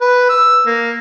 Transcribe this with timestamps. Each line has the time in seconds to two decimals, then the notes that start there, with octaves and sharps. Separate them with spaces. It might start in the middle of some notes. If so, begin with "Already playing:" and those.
0.01 B4
0.29 E6
0.66 A#3